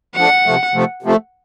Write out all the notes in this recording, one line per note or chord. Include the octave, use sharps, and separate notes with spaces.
F3 A3 D4 F#5
C3 F3 A3
C3 F3 A3
C3 F3 A3